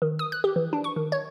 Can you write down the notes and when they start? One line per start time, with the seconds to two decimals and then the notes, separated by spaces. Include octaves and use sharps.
0.02 D#3
0.19 D#6
0.32 F#6
0.44 G4
0.56 E3
0.73 D4
0.84 C#6
0.96 D#3
1.12 C#5